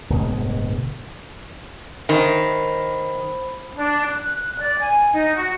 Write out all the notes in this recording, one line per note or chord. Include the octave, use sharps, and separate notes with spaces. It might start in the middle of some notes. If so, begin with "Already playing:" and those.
D1 G1 B2 G#3
D#3 C5 B5
D4
F#6
D5
G#5
D#4
F#4